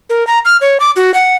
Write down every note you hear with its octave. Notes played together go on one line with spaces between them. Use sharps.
A#4
A#5
F6
C#5
D6
F#4
F#5